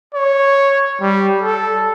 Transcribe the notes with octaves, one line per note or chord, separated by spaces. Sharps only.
C#5
G3
A4